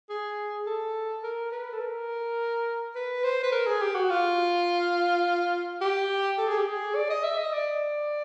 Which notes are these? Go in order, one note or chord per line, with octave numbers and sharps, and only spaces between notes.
G#4
A4
A#4
B4
A4
A#4
B4
C5
B4
A#4
G#4
G4
F#4
F4
G4
A4
G#4
G4
G#4
D5
D#5
E5
D#5
D5